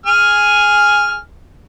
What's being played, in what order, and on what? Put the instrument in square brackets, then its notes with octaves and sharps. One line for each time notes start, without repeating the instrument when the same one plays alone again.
[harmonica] G#4 G#5 F6